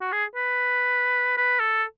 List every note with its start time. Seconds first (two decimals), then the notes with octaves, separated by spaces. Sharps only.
0.01 F#4
0.13 G#4
0.35 B4
1.38 B4
1.60 A4